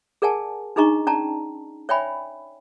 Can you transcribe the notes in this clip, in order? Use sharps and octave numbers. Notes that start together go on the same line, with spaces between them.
G#4 A#4 D5 F#5 G#5 A5
D4 D#4 G#4 D#5 A#5 C#6
C#4 D5 G5 A5 A#5
C#5 D5 E5 G5 G#5 B5